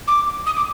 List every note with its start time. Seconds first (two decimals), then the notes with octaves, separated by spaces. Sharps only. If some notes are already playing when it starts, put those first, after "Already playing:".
0.08 D6
0.46 D#6
0.56 D6